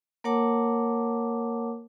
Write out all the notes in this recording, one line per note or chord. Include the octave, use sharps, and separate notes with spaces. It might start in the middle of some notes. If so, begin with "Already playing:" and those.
A#3 A#4 C#5 F#5 A5 D6